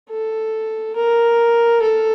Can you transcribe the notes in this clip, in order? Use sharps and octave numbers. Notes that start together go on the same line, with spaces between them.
A4
A#4
A4